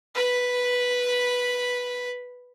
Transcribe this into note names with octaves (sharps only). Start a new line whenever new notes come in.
B4 B5